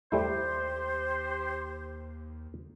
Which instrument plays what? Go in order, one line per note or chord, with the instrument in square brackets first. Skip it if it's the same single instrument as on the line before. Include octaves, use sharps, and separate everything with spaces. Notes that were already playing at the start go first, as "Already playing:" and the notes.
[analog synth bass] D#2 [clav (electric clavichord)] G3 A3 E4 [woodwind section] G4 C5